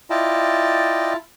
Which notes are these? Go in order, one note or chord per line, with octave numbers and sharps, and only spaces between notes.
E4 F4 D5 D#5 G5 A5